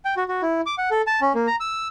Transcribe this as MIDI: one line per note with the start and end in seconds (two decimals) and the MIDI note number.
0.05 0.14 79
0.17 0.24 66
0.28 0.41 66
0.42 0.61 64
0.66 0.75 86
0.78 0.89 78
0.91 1.02 69
1.07 1.20 81
1.21 1.33 61
1.35 1.47 58
1.47 1.56 82
1.60 1.88 88